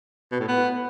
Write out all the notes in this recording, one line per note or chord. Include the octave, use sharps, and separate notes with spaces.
B2
A2
B3